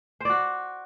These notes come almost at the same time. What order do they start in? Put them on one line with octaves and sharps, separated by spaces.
C5 D5 F#4